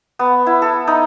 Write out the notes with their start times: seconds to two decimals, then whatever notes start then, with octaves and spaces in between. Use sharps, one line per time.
0.19 B3
0.46 E4
0.62 A4
0.87 D#4